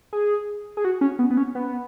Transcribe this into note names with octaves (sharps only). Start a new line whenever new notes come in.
G#4
G#4
F#4
C#4
B3
B3
C#4
B3